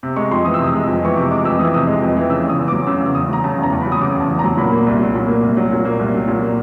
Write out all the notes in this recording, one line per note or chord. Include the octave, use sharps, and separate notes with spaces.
C3
G#3 C#6
F2 C6
E3 D#6
E6
C3 D#6
G#3
F2
E3 C#6
C3 D6
G#3 D6
F2 E6
E3 D#6
C3 D#6
G#3
F2
E3
C#3 E6
E2 D#6
E2
D6
F#3
C#3 E6
E2
E2 D#6
F#3 A#5
C#3 A5
E2
A#5
E2
B5
F#3
D#6
C#3 D6
E2
A5
E2
A#5
F#3
A#2 B5
A#3
C2
F#3
A#2
A#3
C2
F#3
A#2
A#3
C2
F#3
A#2
A#3